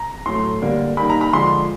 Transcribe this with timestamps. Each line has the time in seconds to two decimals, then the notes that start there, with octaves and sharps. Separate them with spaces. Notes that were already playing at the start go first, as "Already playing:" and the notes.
Already playing: A#5
0.26 A2 F#3 A3 C6
0.62 D3 G3 A#3
0.97 D#3 G3 A#3 B5
1.10 A#5
1.21 B5
1.33 D3 F3 G#3 C6